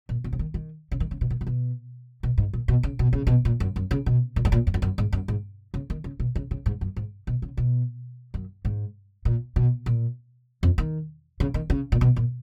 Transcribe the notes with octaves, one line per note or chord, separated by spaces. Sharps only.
A#2
B2
C#3
D#3
D#3
C#3
D#3
C#3
B2
A#2
A#2
B2
B2
G#2
A#2
B2
C#3
B2
C#3
B2
A#2
F#2
F#2
C#3
B2
A#2
G#2
A#2
F#2
F2
F#2
G#2
F#2
G#2
C#3
D#3
C#3
B2
C#3
C#3
G#2
F#2
G#2
B2
C#3
B2
F#2
G#2
A#2
B2
A#2
F2
D#3
C#3
D#3
C#3
A#2
B2
A#2